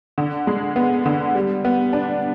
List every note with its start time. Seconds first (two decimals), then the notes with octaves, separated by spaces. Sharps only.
0.18 D3
0.47 G#3
0.76 B3
1.06 D3
1.35 G3
1.65 B3
1.93 D4